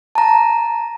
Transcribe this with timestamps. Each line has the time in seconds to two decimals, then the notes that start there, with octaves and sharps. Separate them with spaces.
0.15 A5 A#5